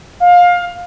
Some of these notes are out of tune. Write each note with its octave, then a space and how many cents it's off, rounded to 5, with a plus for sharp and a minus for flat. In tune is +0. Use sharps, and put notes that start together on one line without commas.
F5 +20